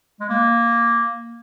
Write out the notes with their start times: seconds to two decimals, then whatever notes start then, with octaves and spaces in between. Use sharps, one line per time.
0.20 G#3
0.29 A#3